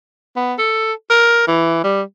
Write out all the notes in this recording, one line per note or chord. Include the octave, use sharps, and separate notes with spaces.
B3
A4
A#4
E3
G3